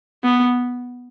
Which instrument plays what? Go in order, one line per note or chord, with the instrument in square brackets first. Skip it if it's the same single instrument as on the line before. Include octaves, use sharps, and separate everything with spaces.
[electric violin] B3